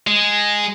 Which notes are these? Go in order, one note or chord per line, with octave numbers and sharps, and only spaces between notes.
G#3